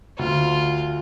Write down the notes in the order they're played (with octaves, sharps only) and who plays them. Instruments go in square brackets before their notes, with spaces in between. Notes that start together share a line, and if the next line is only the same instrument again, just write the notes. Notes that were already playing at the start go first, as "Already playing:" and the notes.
[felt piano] D2 [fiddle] F4